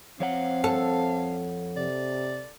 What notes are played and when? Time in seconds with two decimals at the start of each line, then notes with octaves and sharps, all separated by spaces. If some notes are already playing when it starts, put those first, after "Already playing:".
0.20 F2 C4 C#5 F5 F#5
0.64 A4
1.77 C3 D5